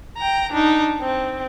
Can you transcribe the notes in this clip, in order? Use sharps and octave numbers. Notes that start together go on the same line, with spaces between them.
G5 A#5
D4 D#4
C4